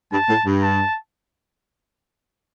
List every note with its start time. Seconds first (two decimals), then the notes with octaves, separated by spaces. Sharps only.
0.12 G2 A5
0.29 A2
0.46 G2
0.63 A5